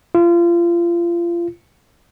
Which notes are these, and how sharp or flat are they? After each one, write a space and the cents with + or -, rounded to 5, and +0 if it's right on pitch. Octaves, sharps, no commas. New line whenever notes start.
F4 -30